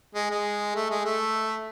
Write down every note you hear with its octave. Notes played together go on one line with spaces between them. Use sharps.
G#3
G#3
A3
G#3
A3